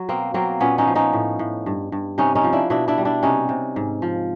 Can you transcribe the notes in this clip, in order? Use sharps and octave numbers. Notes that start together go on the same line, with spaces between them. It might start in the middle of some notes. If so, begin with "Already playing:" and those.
Already playing: F#3
B2 A#3 C4
F#3 A#3 C4
A#2 B3 C#4
C#4 D#4
F3
C#4 D#4
A2
A2
G2
G2
C3 C#4 D#4
C#4 D#4
F3
D4 E4
B2 D4 E4
D4 E4
G3
D4 E4
C3 C#4 D#4
C3
G#2
F3